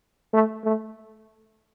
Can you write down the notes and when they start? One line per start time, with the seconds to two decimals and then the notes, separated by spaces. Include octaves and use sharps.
0.33 A3
0.64 A3